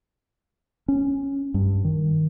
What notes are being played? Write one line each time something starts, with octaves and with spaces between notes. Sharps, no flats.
C#4
G2
D#3